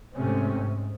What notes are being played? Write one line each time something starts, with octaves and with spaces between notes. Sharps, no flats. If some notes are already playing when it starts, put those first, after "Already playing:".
G#2 C3 A3 C4 C#4
G#2